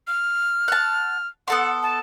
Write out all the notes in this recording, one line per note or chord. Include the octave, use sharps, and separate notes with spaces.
F6
F#5 A5
B3 A4 F#5 C6
A5